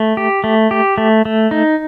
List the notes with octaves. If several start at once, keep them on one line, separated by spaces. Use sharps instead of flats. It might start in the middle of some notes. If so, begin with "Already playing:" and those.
Already playing: A3
G4
A3
G4
A3
A3
D#4